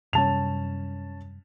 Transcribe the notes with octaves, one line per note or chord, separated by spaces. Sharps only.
F#2 C3 G3 C#4 A5 F7